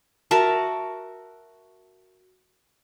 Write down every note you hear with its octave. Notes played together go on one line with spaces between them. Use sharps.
F#4 A#4 E5 A5